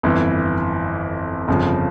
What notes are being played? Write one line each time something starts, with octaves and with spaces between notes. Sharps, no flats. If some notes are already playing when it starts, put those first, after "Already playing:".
G1 F2 E3
G1 F2 C#3 F3